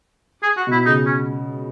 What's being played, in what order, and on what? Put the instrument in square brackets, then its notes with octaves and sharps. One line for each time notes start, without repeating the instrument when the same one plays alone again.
[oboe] G#4
F#4
[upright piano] B2
[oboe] E4
[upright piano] C#3 [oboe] D#4
[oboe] C#4